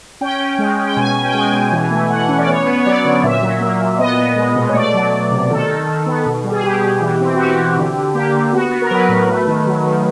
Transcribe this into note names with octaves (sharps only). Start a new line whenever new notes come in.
C#4 G5
C#4
G#3
C#4
G5
B2 G#5
C#4
G5
G#3 G#5
B2
E3
A3
E3 F#5
C#4
D5
B3 C#5
B3
C#5
F#3 D5
D3
A#2 E5
F#3
A#3
A#2
B3 D#5
B3
G#3
B2
C#5
A3 D5
F#3
F#3
C3
D#3 A4
D#3
D#3
B3
B2
G3
G#4
B2 G4
B2
E3
C4
F#4
E3 G4
E3
D3
D3
A#3 G4
D3
B3 F#4
B3
A#4
F#3 B4
A2
A3
D#3
F#3
D#3